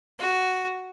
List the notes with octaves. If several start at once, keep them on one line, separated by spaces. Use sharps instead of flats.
F#4